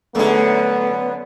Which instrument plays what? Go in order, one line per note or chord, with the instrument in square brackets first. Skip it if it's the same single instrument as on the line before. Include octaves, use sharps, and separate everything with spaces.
[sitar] F#2 D3 [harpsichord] A3 G#4 [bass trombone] B3